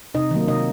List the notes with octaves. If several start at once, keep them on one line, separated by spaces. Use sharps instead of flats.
C3 D#4 D#5
D#3 F#3 A#3
C3 D#4 D#5